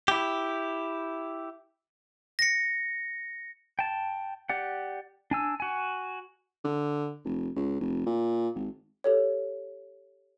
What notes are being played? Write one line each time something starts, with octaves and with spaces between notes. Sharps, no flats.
E4 G4
A#6 C#7
G5 A5
G4 D5 F#5
D4 G#5 E6
F#4 G#5
D3
F1
C#2
F1
A#2
G#1
G4 A4 C#5